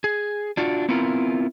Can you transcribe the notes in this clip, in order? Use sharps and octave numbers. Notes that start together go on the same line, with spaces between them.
G#4
D4 F4 F#4
B3 C4 E4 F4 A#4